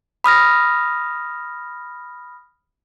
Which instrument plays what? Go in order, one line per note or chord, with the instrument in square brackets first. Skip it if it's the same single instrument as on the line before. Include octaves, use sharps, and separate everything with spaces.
[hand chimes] B5 D#6 F6 A#6